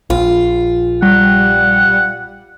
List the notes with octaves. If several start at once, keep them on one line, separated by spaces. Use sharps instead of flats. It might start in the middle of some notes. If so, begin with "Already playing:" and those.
A#1 F4
G3 F#5